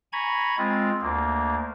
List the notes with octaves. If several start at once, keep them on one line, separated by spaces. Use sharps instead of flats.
G#5 A#5 B5 C#6 G#6
G#3 C4 F4
D2 A#3